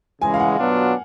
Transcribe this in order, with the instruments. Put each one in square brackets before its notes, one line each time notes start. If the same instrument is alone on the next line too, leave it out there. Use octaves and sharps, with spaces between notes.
[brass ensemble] C#3 E3 G#3 [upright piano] G#5
[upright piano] F5
F#5
[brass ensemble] B2 F#3 B3 D4 F4